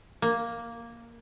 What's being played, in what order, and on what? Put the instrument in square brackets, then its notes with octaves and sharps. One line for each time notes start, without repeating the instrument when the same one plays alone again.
[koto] A#3